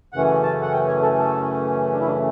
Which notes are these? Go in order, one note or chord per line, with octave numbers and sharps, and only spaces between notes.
F#2 C#3 E3 A3 C#4 F#5
A5
F#5
G5
C#5
A4
A4
D4
E4
D4